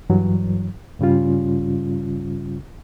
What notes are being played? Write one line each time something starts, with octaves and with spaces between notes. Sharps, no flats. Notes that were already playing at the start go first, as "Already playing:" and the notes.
G2 E3 F#3
G2 C#3 G3 C#4 F4